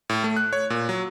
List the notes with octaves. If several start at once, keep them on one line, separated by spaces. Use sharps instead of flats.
A2
A3
F#6
C#5
A#2
F#3